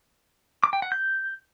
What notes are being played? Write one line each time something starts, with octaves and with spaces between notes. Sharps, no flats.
D6
G5
F#5
G6